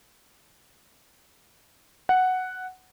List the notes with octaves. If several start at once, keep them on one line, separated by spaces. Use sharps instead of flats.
F#5